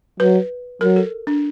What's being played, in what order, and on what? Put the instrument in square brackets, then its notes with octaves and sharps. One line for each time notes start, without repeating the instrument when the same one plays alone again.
[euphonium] F#3 [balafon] B4
[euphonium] F#3 [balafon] A#4
[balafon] A4
D4